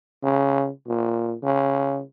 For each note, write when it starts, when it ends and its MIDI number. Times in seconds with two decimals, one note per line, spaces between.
0.23 0.69 49
0.87 1.34 46
1.43 2.01 49